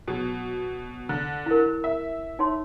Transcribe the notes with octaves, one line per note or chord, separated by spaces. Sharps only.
B2 F#3
D3
E4 A#4
E5
D#4 C#5 C6